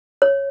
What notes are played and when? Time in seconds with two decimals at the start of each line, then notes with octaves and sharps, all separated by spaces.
0.22 C#5